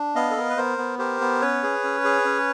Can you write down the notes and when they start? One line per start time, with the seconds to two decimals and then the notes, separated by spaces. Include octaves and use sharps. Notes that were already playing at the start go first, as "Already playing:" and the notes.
Already playing: D4
0.15 B3 D#5 F5
0.31 A4
0.37 B3 A#4
0.49 B4
0.57 B3 A#4 C5
0.78 B3
0.99 G4 A#4 C5
1.21 B3
1.41 C#4 B4 C#5
1.63 G#4
1.84 C#4
2.04 G#4
2.25 C#4